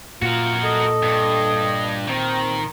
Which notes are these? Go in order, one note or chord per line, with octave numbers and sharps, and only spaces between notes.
A#2 F4 F#4 A#4
A4 D#5
G2
D#3 C4